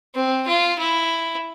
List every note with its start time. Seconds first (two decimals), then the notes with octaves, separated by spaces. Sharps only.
0.15 C4
0.48 F4
0.79 E4